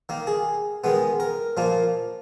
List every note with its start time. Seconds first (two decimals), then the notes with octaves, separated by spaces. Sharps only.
0.09 D#3 A#3
0.27 G#4
0.84 D#3 G#3 B3
1.20 A#4
1.57 A#2 F3 A#3